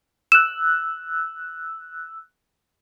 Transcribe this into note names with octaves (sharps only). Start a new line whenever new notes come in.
E6 F#6 E7